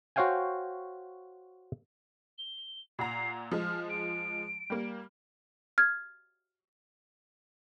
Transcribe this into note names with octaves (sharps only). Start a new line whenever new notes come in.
F#4 C5 C#5 F5 G5 G#5
G7
A#2 F#5 A#5 C7
F3 G#3 F6
D7
G3 A#3
F6 G#6